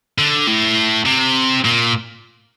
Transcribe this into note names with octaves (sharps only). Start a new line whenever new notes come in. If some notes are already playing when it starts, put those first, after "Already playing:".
D3
A2
C3
A#2